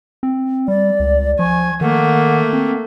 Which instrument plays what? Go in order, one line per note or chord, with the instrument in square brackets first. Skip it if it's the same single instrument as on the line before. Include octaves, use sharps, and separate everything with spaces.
[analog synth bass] C4
[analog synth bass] G3 [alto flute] D5
[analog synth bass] C#2
[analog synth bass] F3 [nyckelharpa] G#5 [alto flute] C#6
[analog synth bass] D#3 [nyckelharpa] A3 A#3 [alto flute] F#5
[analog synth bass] C4